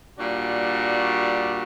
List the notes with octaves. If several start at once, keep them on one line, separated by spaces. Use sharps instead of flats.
A#2 G3 D4 F#4